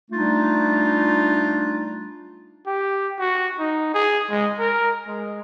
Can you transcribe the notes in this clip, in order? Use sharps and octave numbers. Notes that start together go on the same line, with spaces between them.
G3 A3 D4 D#4 F4
G4
F#4
D#4
G#4
G#3
A#4
G#3